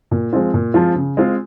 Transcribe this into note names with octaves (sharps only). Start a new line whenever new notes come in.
A#2
F3 G#3 C4 F4
A#2
F3 G#3 C4 F4
C#3
G#3 C4 F4 G#4